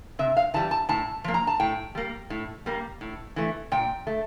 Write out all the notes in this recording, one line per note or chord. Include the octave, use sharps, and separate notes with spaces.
C3 E5
F5
E3 G3 A5
A5
A2 A5
F3 A#3
A#5
A5
A2 G5
G3 A#3
A2
G3 A#3
A2
E3 A3
A#2 G5
A3